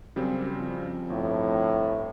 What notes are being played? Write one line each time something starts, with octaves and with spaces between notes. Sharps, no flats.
F#2 C#3 G3 C4
F2
G1 A2